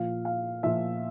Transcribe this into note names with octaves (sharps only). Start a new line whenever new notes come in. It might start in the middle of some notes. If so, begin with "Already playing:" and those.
Already playing: A#2 F3 F5
F5
A#2 F3 E5